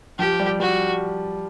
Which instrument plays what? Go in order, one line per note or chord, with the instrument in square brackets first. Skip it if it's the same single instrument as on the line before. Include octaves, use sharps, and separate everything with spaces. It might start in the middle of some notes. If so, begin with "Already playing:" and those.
[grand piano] F3 [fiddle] G4
[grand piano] G3
[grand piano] G3 [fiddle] F#4